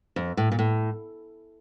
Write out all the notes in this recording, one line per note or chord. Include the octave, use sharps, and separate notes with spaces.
F2
A2
A#2
A2